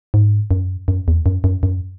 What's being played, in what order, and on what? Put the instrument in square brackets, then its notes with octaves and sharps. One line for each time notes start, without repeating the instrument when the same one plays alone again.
[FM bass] G#2
F#2
F#2
E2
F#2
F#2
F#2